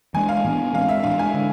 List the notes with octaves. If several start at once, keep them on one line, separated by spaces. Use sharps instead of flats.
E3 G#3 D4 G#5
F5
A2 E3 B3 D4
E3 G#3 C4 F5
E5
A2 G#3 D4 F5
G#5
D3 G#3